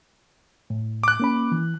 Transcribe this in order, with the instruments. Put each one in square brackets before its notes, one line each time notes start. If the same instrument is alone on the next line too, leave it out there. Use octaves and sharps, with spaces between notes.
[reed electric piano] A2
[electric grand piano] D6 F#6
[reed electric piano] A#3 C#4 B5
E3